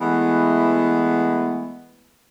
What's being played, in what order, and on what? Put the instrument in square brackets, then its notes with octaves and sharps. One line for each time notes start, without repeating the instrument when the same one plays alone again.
[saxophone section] E3 G#3 A3 B3